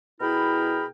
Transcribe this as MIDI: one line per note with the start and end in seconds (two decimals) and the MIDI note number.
0.21 0.86 47
0.21 0.86 64
0.21 0.86 68
0.21 0.86 70
0.21 0.86 79
0.21 0.86 83